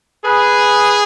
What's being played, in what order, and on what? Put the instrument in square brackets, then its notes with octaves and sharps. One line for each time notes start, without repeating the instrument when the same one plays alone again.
[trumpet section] G#4 [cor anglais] B4